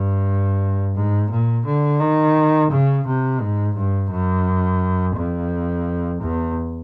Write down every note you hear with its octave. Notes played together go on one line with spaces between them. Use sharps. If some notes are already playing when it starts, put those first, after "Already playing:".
Already playing: G2
G#2
A#2
D3
D#3
C#3
C3
G#2
G2
F#2
F2
E2